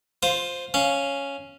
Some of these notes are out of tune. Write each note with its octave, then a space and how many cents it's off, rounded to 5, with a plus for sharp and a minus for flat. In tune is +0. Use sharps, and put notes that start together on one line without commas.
F4 +15 C5 +0
C#4 +0 F5 +0